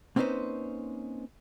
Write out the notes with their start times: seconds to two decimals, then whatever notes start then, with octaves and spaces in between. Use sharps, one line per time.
0.16 A#3 C4 C#4 D#4 B4 C5